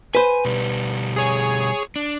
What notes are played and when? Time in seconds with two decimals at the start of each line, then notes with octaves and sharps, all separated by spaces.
0.15 B4 C5 G#5
0.45 B2 G3
1.16 G#4 C#5
1.96 D4